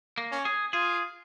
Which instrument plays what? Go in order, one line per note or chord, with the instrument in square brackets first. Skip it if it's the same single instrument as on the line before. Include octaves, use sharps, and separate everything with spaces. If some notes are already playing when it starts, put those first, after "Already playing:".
[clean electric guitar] A#3
[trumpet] C#4
[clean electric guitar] G#4
[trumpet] F4 [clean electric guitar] G#4